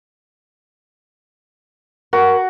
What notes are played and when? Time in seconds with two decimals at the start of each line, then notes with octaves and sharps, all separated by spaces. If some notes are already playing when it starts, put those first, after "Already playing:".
2.13 F#4 A#4